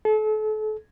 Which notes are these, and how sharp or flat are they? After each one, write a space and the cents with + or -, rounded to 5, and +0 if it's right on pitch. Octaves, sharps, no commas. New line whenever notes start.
A4 -35